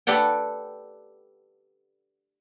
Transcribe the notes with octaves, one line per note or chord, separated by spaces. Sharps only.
G4 A4 B4 D5 F#5 G5